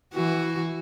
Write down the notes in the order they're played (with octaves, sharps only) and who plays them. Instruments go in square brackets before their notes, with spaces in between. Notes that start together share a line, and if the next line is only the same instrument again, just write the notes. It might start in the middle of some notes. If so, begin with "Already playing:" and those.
[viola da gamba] E3 F#4